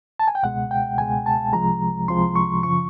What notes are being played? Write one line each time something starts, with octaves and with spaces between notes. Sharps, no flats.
A5
G#5
G5
C#2 B2 G#3 F#5
G5
C#2 B2 G#3 G#5
A5
C2 C3 F3 G#3 A#5
C2 C3 F3 G#3 C6
C#6
F#2 C#3 F3 C#6